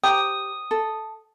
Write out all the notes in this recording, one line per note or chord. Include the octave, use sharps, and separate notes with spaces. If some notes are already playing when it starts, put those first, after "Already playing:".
G4 G5 A#5 D#6
A4